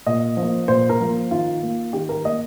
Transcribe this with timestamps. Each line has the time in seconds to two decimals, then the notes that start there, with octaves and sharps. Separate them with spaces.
0.07 A#2 D#5
0.37 F3
0.42 A#3
0.68 A#2 C5
0.90 A#4
1.01 F3 A#3
1.31 D#3 F4
1.63 A#3
1.93 D#3 G4
2.09 A#4
2.25 A#3 D#5